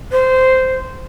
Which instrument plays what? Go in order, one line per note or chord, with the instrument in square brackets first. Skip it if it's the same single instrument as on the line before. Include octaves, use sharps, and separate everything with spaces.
[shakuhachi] C5